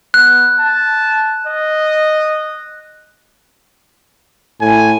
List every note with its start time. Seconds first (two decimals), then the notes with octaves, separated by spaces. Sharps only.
0.14 B3 F#6
0.60 A5
1.47 D#5
4.61 A2 G#5